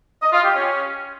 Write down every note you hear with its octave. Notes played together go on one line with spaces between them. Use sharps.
D#5
F4
G4
C#4